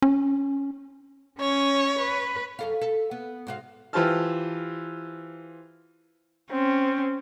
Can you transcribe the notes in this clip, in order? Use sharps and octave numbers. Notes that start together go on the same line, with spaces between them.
C#4
C#4 C#5
B4
F#2 A4 F5
A4
B3
G#2 F#4 F5
E3 F4 G4 C5 A5 F6
C4 C#4